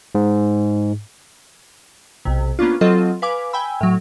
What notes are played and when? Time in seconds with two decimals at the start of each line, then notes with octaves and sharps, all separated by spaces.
0.15 G#2
2.25 B1 C3
2.59 A#3 B3 C#4 D4 F4
2.81 F#3 C4 F4 A4 D#5
3.22 B4 F5 G#5 D6
3.53 G5 G#5 B5 E6
3.81 A2 F#3